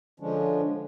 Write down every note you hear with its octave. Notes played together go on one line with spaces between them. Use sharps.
D3 F3 G#3 C#4 D4